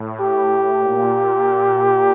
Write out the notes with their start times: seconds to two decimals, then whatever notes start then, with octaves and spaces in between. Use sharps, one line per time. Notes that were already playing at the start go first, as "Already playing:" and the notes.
Already playing: A2
0.20 G4
0.81 A#2
1.11 A#2